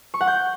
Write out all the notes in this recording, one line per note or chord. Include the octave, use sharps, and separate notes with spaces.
C#6
F#5
G6